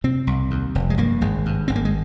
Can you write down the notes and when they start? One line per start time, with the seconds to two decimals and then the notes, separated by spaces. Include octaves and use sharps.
0.04 C3 C4
0.27 C2
0.51 D#2
0.75 F1
0.90 G#3
0.98 G2 A#3
1.21 G#1 G#3
1.46 G2
1.68 G#1 C4
1.76 A#3
1.85 G#3